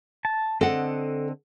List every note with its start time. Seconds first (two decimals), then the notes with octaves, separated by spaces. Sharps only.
0.25 A5
0.61 D3 C4 A4 D#5 F#5